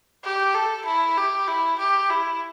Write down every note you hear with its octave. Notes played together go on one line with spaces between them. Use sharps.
G4
A4
E4
G4
E4
G4
E4